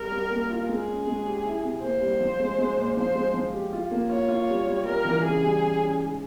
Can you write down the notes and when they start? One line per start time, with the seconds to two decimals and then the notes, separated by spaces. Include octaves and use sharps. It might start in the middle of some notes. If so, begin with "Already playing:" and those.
Already playing: G3 A#4
0.12 G3
0.30 A#3
0.50 F4
0.69 G#3 G#4
0.87 C#4
1.07 G#3
1.26 G4
1.45 E4
1.64 C3
1.82 A#3 C5
2.01 G3
2.20 F3
2.39 G#3
2.58 G#3
2.77 A#2
2.97 F3 C5
3.15 G#3
3.34 F3
3.53 G4
3.73 F4
3.91 A#3
4.10 F4 C#5
4.28 F4
4.48 G3
4.67 G3
4.85 G3 A#4
5.05 E3
5.24 C#3 G#4
5.42 G3
5.61 C#3
5.80 C#4
5.99 G#2